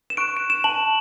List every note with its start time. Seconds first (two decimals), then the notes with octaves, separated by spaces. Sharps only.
0.10 E7
0.17 C#6 F#6 D7
0.37 D7
0.50 E7
0.64 A5 F#7